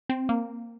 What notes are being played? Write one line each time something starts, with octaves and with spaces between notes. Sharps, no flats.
C4
A#3